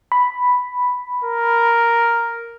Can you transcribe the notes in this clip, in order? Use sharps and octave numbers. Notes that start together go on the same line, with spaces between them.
B5
A#4